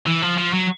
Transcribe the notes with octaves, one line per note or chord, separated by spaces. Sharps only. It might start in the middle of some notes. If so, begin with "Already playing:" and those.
E3
F3
F3
F#3